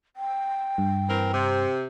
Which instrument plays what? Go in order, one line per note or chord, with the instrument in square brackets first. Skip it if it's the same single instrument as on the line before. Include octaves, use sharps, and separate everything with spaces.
[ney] G5
[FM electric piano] G2
[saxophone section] E3 C4 A#4
C3